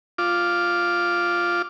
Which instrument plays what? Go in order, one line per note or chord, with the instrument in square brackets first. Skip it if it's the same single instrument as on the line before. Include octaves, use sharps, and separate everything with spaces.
[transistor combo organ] F4 D6